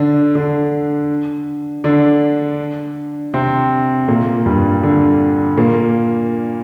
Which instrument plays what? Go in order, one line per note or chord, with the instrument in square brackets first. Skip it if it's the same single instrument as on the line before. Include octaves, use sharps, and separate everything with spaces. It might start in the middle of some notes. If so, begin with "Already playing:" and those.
Already playing: [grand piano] D3 D4
D3 D4
D3 D4
C3 C4
A#2 A#3
G2 G3
D3
A#2 A#3